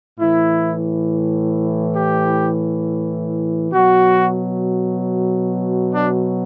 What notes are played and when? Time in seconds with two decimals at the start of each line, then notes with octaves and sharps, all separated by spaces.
0.19 A2 E3 E4
1.96 G4
3.73 B2 F#3 F#4
5.94 D4